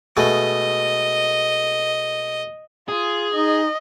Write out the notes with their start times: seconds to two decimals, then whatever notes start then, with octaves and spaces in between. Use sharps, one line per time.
0.17 B2 G#3 A3 D#5
2.89 F4 G#4
3.34 D#4 D#5